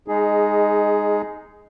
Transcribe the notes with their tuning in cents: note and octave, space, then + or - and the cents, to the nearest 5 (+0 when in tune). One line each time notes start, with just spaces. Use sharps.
G#3 -15 D#4 +0 G#4 +10